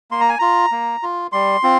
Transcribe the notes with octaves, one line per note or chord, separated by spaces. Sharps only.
A#3 C6
A#5
G#5
F4 A#5
A#3
F4
G3 C6
C4 F4